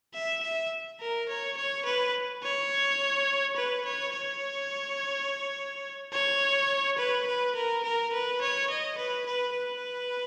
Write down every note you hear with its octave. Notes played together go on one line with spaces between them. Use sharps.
E5
E5
A#4
C#5
C#5
B4
C#5
B4
C#5
C#5
C#5
B4
B4
A#4
A#4
B4
C#5
D#5
B4
B4
B4